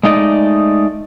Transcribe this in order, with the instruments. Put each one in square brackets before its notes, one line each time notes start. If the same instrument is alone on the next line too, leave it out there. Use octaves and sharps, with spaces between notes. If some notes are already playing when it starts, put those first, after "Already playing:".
[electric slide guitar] G#3 A3 D#4 D5 D#5